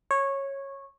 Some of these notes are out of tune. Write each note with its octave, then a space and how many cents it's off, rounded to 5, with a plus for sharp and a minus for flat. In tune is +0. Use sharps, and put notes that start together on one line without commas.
C#5 -15